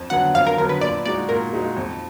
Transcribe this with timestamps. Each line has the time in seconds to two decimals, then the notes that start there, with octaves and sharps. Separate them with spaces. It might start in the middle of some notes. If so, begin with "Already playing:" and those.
Already playing: F2
0.10 D3 F#3 B3 F#5
0.35 F2 F5
0.47 A#4
0.58 D3 F#3 B3 A#4
0.69 B4
0.81 A#2 D5
1.06 G#3 D#4 F#4 D5
1.29 A#2 A#4
1.53 G#3 D#4 F#4
1.77 F2